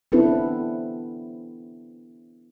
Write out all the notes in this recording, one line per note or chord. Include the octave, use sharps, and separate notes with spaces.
B3 C4 D4 E4 A4 B4